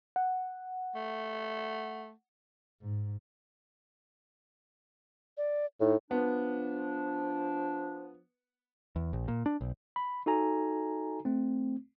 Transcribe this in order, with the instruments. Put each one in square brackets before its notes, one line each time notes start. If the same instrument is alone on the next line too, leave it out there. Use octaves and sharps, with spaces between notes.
[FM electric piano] F#5
[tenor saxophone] A3
[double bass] G#2
[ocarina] D5
[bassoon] A2 [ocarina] D#4
[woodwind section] F3 D4 [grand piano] B3
[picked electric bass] E2
A#1
A#2
D4
B1
[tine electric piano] B5
D#4 F#4 A4 G#5 A#5
A3 C4